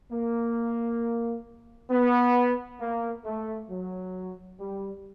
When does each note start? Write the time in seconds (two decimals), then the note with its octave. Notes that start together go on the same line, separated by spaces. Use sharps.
0.12 A#3
1.91 B3
2.80 A#3
3.25 A3
3.70 F#3
4.60 G3